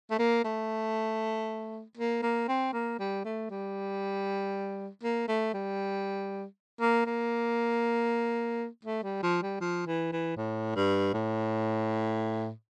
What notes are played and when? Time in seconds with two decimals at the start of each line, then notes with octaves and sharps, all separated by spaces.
0.11 A3
0.19 A#3
0.44 A3
1.97 A#3
2.23 A#3
2.48 C4
2.73 A#3
2.99 G3
3.25 A3
3.50 G3
5.03 A#3
5.28 A3
5.54 G3
6.81 A#3
7.06 A#3
8.85 A3
9.03 G3
9.23 F3
9.42 G3
9.61 F3
9.87 E3
10.12 E3
10.37 A2
10.76 G2
11.14 A2